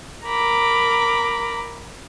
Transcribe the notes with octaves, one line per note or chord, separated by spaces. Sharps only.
A#4 A#5 B5 D6